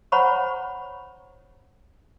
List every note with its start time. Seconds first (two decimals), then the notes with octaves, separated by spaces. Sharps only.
0.12 C5 C#5 F#5 A#5 B5 C#6